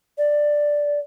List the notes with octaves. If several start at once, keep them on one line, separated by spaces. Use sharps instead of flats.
D5